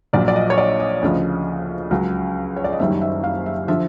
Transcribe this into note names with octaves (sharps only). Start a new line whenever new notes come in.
A#1 A#2 F#3 D5
D5
D#5
C#5
D5
D#5
D2 C#3 F3
C#2 C#3 F#3
C#5
D5
D#5
F#1 F#2 D#3 G3 E5
E5
F5
E5
D3 F3 E5